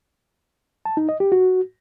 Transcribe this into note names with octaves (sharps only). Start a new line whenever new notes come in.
A5
D#4
D#5
G4
F#4